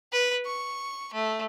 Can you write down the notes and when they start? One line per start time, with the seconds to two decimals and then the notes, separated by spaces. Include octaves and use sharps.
0.12 B4
0.45 C#6
1.13 A3